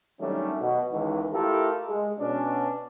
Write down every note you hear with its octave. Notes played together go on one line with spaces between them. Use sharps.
D#3 F#3 G3 A3 C#4 D4
B2
C#2 D#3 E3
A3 E4 F4 G4 A4 A#4
G#3
B2 C#4 D4